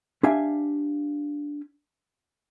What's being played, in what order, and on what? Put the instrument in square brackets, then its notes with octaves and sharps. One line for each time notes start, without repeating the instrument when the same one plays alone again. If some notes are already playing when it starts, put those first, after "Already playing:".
[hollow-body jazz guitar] D4 G4 E5 F5 G#5